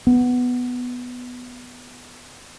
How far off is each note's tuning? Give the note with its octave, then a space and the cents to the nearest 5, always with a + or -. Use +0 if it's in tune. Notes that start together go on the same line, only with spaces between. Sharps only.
B3 +0